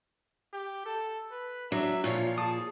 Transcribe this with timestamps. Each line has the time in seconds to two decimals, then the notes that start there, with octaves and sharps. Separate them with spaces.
0.53 G4
0.86 A4
1.32 B4
1.72 F#3 D4 E5
2.04 A#2 F3 F4 C#5
2.38 G#4 A5 D#6